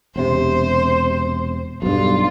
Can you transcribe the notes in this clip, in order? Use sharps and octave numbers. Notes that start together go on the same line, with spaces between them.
E1 C3 C5
B1 G2 F4